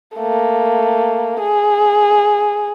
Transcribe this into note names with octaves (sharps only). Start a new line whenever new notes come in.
A3 A#3
G#4